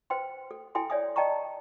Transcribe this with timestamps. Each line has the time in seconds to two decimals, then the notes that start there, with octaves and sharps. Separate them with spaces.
0.10 B4 C5 G5 C6
0.51 A4
0.75 E4 A4 G5 G#5 C6
0.90 C#5 D5 E5 G#5 D#6
1.16 D5 D#5 G5 A5 A#5 C#6